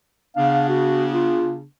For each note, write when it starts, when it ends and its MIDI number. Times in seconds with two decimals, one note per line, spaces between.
0.36 1.63 49
0.36 1.63 59
0.36 1.63 62
0.36 0.64 77
0.69 1.07 66
1.12 1.54 65